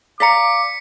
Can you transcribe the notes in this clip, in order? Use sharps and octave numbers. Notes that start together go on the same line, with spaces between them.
D5 F5 A#5 D6 B6 C#7